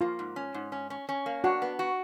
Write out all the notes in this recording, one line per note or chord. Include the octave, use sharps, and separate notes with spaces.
A#3 F4
G#2
C#4
G#2
C#4
C#4
C#4
A#3
D4 F#4
B3
F#4